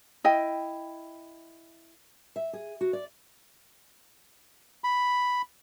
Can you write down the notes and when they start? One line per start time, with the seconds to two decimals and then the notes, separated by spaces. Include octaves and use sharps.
0.24 E4 D#5 G5
2.36 E5
2.53 G#4
2.81 F#4
2.93 D5
4.84 B5